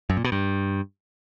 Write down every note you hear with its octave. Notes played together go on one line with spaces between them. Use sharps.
F#2
A#2
B2
G2